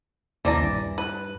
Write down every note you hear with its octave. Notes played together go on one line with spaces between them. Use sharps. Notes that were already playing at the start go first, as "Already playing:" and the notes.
A#1 D#2 E3 C4 D5 A#5
G2
B4